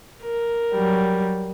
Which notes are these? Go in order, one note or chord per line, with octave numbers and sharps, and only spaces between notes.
A#4
F#3 G3